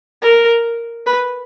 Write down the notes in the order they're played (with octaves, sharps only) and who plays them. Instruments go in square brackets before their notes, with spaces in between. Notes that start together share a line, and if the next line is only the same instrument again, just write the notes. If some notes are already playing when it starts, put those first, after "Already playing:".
[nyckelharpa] A#4
B4